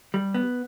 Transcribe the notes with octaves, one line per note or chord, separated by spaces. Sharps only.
G3
B3